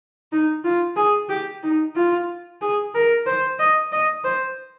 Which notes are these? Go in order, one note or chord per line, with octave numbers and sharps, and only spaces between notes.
D#4
F4
G#4
G4
D#4
F4
G#4
A#4
C5
D#5
D#5
C5